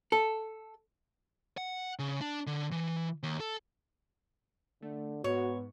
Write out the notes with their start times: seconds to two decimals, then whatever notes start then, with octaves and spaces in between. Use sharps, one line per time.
0.12 A4
1.58 F#5
1.99 C#3
2.21 D4
2.47 D3
2.72 E3
3.23 D#2
3.40 A4
4.82 D3 A3
5.24 G#2 B3 F#4 C#5